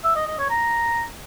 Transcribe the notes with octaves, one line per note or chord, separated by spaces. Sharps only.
E5
D#5
D#5
C#5
A#5